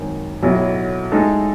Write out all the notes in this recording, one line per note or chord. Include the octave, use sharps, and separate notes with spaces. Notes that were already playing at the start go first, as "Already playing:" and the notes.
Already playing: G#1 F#2 D#3
B1 A2 F#3 A3 E4
A2 G#3 D#4 A4